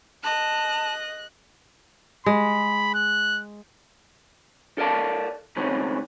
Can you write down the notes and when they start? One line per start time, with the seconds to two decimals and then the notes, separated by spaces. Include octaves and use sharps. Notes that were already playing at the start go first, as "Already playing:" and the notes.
0.24 D#5 A5 F#6
2.26 G#3 B5
2.94 F#6
4.78 A4 A#4 D5 F5 A5
5.56 C#2 D#3 E3 A3 C4 C#4